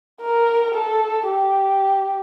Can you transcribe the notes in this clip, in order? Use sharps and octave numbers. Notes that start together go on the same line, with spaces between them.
A#4
A4
G4